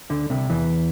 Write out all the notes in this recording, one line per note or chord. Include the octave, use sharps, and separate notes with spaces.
D2 D3
C2 C3
E2 E3